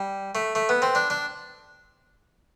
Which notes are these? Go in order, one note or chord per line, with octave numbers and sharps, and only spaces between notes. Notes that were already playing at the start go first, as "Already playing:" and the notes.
Already playing: G3
A3
A3
B3
C4
D4
D4